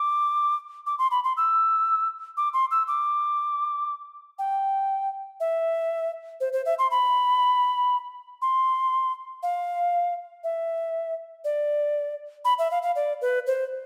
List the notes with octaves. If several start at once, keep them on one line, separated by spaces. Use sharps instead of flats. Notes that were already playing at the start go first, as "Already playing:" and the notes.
Already playing: D6
D6
C6
B5
C6
E6
D6
C6
E6
D6
G5
E5
C5
C5
E5
C6
B5
C6
F5
E5
D5
B5
E5
F5
F5
D5
B4
C5